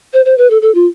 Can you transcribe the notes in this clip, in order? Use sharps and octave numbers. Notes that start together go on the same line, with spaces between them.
C5
C5
B4
A4
A4
F4